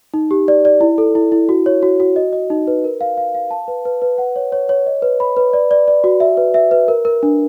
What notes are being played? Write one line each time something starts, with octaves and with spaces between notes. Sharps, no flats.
D#4
G4
D5
D5
E4
A4
E4
E4
F#4
C#5
F#4
F#4
D#5
D#5
D#4
B4
A#4
F5
F5
F5
A5
B4
B4
B4
F#5
C#5
C#5
C#5
D#5
B4
B5
B4
D5
D5
D5
F#4
E5
B4
E5
B4
A#4
A#4
D4